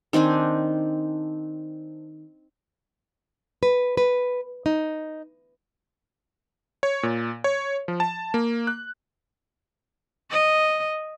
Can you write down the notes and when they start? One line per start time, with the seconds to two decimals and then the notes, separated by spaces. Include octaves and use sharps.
0.13 D#3 C4 D4 G#5
3.63 B4
3.97 B4
4.66 D#4
6.83 C#5
7.03 A#2
7.44 C#5
7.88 F3
8.00 A5
8.34 A#3
8.67 F#6
10.30 D#5